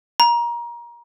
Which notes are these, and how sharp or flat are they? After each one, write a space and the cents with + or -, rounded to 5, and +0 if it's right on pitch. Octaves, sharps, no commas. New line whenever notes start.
A#5 +25